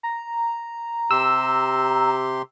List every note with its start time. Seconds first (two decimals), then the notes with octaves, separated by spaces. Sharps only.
0.03 A#5
1.11 C3 G4 C6 E6